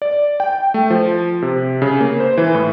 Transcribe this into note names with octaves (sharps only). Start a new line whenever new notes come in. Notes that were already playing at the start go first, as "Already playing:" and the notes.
D5
G5
A3
F3
C3
C#3
A#3
C5
E3
A2